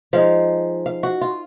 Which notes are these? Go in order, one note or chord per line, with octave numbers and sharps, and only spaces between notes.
F3 G#3 D#4 F5
F5
F#4
F4